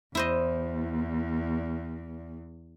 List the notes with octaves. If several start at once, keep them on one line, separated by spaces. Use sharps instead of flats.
E2 E4 C5 D#5